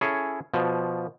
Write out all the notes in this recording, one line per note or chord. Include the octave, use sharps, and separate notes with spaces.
C#4 E4 G#4 A4 C#5
B2 F3